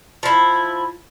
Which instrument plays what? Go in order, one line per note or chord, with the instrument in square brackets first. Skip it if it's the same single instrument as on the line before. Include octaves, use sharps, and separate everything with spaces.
[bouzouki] F3 E4